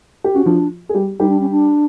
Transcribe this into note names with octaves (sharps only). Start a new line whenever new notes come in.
G4
C#4 F#4
F3 D4 F4
G#4
G3 G4
G3 D#4 G4
D4
C#4
D4